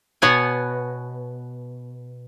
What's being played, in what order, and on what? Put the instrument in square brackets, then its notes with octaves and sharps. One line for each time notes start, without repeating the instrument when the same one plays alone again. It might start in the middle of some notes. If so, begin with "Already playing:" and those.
[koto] B2 B3 C#5 F#5 G#5